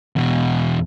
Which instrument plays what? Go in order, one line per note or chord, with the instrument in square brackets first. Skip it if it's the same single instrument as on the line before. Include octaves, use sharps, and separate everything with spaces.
[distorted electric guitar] E2 B2